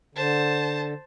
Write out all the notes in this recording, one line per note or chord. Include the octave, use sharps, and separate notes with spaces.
D3 C5 A5